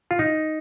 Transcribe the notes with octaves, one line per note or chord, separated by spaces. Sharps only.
F4
D#4